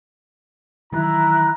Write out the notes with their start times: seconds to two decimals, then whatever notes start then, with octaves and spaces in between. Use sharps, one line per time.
0.93 D#3 E3 F#3 E4 A#5 F#6